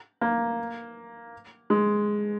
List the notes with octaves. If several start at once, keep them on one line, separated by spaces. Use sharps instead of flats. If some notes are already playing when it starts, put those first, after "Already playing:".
A#3
G#3